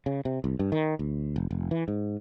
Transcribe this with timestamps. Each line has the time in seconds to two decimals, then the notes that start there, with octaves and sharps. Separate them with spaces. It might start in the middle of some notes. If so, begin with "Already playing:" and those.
0.06 C#3
0.25 C3
0.44 C2
0.59 G2
0.72 D#3
0.99 D2
1.36 F1
1.51 F1
1.71 E3
1.88 G#2